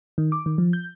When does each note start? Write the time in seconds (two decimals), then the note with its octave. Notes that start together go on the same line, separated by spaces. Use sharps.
0.18 D#3
0.32 D6
0.46 D#3
0.58 F3
0.73 G6